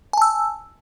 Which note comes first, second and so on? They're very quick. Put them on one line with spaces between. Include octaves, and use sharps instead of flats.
G#5 A5 E6